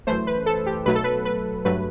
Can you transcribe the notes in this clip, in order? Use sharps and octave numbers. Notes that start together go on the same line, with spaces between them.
F#2 E3 A3 C5
B4
A4
G4
B1 B2 F#3 A3 B4
A4
B4
B4
G2 F#3 A3 B4